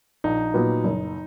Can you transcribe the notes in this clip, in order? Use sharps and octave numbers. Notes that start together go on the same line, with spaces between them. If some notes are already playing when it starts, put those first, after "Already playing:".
A#1 D#4
A#2 F#3 B3
F#1